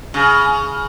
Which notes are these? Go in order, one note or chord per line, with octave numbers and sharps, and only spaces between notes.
C#3